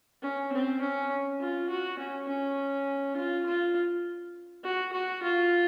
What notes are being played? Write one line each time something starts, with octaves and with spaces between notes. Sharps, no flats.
C#4
C4
C#4
F4
F#4
C#4
C#4
F4
F4
F#4
F#4
F4